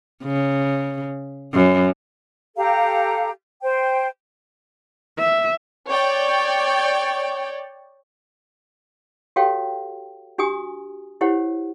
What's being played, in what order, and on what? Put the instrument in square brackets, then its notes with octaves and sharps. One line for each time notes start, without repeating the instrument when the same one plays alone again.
[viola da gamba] C#3
F#2
[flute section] G4 A4 F5 A#5
C5 G5
[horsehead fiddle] E5
[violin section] C#5 D5 G5
[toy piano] F#4 G4 A4 C#5 F5 G5
D4 F#4 G4 G#5 D#6
E4 G4 C5 C#5 F#5